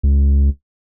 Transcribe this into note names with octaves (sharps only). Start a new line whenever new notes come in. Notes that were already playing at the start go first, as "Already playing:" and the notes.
C#2